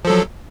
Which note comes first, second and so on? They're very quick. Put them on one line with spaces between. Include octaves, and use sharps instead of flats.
F3 A4 F#3